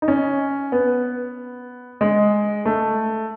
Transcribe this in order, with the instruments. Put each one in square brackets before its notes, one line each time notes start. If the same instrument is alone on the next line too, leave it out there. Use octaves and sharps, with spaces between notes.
[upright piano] D#4
C#4
B3
G#3
A3